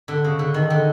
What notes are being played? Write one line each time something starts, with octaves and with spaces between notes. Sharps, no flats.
D3
C#3
D3
D#3
D3